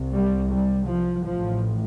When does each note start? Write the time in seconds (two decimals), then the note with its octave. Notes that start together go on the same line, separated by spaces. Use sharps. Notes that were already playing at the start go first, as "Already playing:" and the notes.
Already playing: C2 C3
0.14 G3
0.51 G3
0.87 F3
1.24 A1 A2 F3